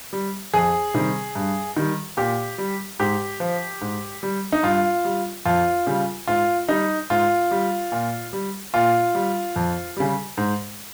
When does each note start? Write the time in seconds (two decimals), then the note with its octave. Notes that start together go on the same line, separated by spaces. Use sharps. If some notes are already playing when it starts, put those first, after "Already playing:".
0.13 G3
0.54 F2 G#4
0.94 C3 D#3 G3
1.36 G2
1.77 D#3 G3
2.17 A#2 G4
2.58 G3
2.99 G#2 G4
3.40 F3
3.81 G#2
4.23 G3
4.52 D#4
4.63 G2 F4
5.05 G3
5.46 F2 F4
5.87 C#3 G3
6.27 G#2 F4
6.69 G3 D#4
7.10 G#2 F4
7.51 G3
7.92 A#2
8.33 G3
8.74 A#2 F4
9.15 G3
9.56 F2
9.97 C#3 G3
10.37 G#2